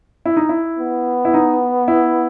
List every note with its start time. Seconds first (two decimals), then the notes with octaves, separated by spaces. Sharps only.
0.25 E4
0.37 D#4
0.49 E4
0.79 B3
1.25 E4
1.34 D#4
1.88 E4